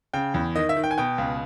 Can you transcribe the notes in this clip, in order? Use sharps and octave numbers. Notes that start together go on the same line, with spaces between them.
C#3 G5
E2
D#3 D#5
E5
D#3
G5
G#5
B2 G5
C#2